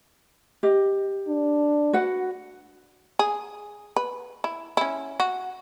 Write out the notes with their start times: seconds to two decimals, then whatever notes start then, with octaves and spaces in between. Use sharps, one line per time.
0.63 G4 D#5
1.28 D4
1.93 F#4 B4 F#5
3.19 G#4
3.96 B4
4.44 E4
4.77 C#4 E4
5.20 F#4